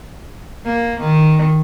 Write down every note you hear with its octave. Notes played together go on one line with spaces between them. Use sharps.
A#3
D#3